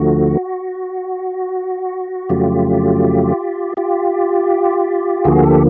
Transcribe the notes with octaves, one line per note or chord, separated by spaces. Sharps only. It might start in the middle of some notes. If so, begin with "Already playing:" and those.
Already playing: D2 D3 F3 A3 F#4
F2 C#3 F#3 A3 F4 G4
F4 G4
D2 D3 F3 A#3 F#4 G#4
G4 A4